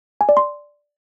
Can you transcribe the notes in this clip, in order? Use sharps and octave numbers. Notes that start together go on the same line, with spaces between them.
G#5
D5
C6